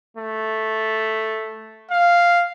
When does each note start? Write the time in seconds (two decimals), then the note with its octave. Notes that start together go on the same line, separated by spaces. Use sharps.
0.17 A3
1.91 F5